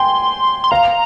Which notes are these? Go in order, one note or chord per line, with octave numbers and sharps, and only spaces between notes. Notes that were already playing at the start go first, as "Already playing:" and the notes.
Already playing: G5 G#5 C6
C6
F5 A#5